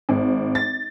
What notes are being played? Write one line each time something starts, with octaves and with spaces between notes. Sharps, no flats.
G#1
A6